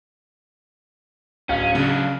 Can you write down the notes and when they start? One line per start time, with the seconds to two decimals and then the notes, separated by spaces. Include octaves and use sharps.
1.49 D1 C#4 F5
1.75 C#3 F#3 D4